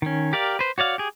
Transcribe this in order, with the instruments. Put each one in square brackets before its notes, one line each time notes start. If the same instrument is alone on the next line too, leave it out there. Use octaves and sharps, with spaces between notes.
[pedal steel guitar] D#3 C#4
G4 A#4 D5 F5
B4 C5
F#4 C#5 D5 F5
G4 G#4